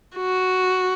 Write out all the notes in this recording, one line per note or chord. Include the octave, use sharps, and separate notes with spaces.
F#4